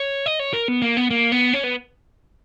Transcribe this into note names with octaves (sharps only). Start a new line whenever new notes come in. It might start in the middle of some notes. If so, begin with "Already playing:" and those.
Already playing: C#5
D#5
C#5
A#4
B3
A#3
B3
A#3
B3
C#4
B3